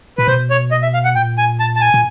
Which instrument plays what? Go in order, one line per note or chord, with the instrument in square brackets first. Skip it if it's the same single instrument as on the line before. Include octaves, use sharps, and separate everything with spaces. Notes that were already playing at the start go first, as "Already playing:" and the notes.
[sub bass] A#2 [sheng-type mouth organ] B4
[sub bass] B2 [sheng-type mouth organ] C5
[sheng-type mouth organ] C#5
D#5
E5
F5
F#5
[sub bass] A#2 [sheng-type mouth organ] G5
[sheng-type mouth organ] G#5
A5
A5
G#5
[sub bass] A#2